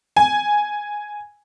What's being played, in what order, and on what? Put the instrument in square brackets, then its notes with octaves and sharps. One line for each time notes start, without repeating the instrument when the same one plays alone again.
[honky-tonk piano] G#5